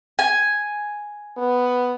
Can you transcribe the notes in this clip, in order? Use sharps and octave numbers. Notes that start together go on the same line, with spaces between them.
G#5
B3